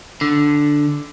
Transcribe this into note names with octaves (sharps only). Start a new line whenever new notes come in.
D3